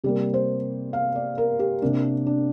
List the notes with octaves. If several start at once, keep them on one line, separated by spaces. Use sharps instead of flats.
C3 G3 A#3 G4
C5
F5
D5
A#4
G4
C3 A#3 D4
D4